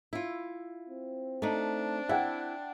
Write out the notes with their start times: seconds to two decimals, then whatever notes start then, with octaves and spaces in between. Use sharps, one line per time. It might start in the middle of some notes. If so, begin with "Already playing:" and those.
0.13 E4 F4
0.89 C4
1.42 A3 D4 D#4
2.09 E4 F#5 G5